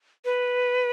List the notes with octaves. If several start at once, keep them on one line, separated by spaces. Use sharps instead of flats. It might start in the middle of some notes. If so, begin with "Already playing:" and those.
B4